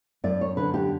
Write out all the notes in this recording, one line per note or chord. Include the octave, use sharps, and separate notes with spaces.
F#2 D5
C#5
D3 B4
G4